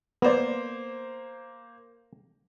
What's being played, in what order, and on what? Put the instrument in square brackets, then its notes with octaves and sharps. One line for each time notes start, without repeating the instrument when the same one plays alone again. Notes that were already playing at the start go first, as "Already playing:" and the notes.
[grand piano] A#3 C5 [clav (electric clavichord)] B3 D5